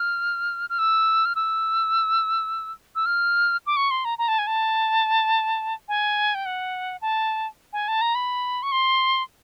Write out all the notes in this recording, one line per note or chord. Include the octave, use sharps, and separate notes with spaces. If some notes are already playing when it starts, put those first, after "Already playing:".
Already playing: F6
F6
E6
F6
E6
E6
F6
D6
C#6
C6
A#5
A#5
A5
G#5
A5
G#5
G5
F#5
A5
G#5
A5
A#5
B5
C#6
C6